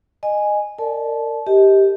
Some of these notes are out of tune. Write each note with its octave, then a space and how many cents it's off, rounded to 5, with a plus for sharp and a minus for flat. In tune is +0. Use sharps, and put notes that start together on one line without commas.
D#5 -20 G#5 +0
A#4 -35 D5 +0 A5 -25
G4 +0 D#5 +35